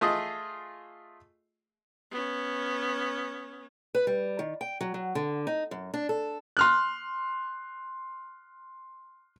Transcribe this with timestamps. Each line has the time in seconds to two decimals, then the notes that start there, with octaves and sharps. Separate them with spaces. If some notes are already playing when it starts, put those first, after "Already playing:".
0.01 A3 F4 G#4 D#5
2.11 B3 C#4
3.95 B4
4.07 G3
4.39 D#3
4.61 G5
4.81 F#3
4.94 F#3
5.15 D3
5.47 D#4
5.71 F#2
5.94 D4
6.09 A4
6.57 C6 F6 F#6